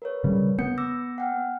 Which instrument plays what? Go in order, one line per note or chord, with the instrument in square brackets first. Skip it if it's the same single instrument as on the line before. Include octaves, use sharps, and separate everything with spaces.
[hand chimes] A#4 B4 C#5
[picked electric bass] C#3 G3
[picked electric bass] B3 [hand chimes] G6 C#7
[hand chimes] D6 E6 A#6
F#5 G5 F6